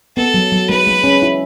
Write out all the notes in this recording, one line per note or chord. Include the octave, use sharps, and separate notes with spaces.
B3 A4
F#3
F#3
G#3 B4
G#3
C#4
E4